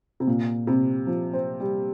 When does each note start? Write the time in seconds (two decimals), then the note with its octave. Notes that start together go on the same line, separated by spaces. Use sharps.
0.20 C3
0.27 A#2
0.67 C3
1.07 F3
1.33 C4
1.60 G3